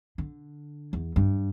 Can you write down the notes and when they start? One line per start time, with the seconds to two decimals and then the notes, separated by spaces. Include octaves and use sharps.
0.18 D3
0.93 E2
1.16 G2